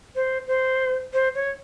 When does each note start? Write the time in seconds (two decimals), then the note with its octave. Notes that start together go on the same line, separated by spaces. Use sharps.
0.15 C5
0.48 C5
1.13 C5
1.35 C#5